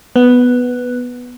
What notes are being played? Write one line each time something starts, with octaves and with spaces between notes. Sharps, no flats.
B3